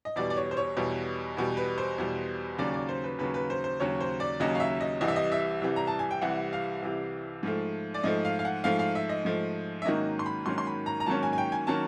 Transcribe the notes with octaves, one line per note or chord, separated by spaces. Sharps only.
D#5
E2 B2 G3 D5
D5
C#5
C5
C#5
E2 B2 G3
E2 B2 G3
B4
C5
E2 B2 G3
D#2 C#3 F#3 D5
D5
C5
B4
D#2 C#3 F#3 B4
B4
C5
C5
D#2 C#3 F#3 C#5
C5
D5
D#2 C#3 F#3 D#5
F5
E5
D#5
C2 C3 E3 G3 D#5
E5
D#5
E5
C2 C3 E3 G3
A#5
A5
G#5
G5
C2 C3 E3 G3 F#5
F5
C2 C3 E3 G3
G#2 F3 A3
D5
G#2 F3 A3 D#5
F5
F5
F#5
G#2 F3 A3 F5
F5
E5
D#5
G#2 F3 A3
E5
G#2 D#3 F#3 A#3 C#4 D#5
C6
B5
G#2 D#3 F#3 A#3 C#4 C6
C6
B5
A#5
A#5
G#2 D#3 F#3 A#3 C#4 A5
G#5
G#5
G5
G#5
D#3 F#3 A#3 C#4 A5